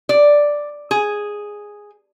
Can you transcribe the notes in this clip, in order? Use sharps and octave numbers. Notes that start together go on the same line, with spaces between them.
D5
G#4